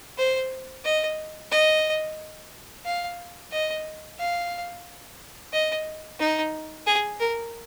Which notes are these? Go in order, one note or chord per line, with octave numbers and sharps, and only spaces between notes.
C5
D#5
D#5
F5
D#5
F5
D#5
D#4
G#4
A#4